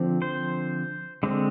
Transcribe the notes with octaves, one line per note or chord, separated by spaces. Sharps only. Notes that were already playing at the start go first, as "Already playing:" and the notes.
Already playing: D3 F3 C4
C5
D3 G#3 C4